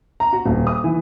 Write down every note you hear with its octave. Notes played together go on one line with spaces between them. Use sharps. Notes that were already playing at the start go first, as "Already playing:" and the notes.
A#5
F#4
D#1
D#6
E3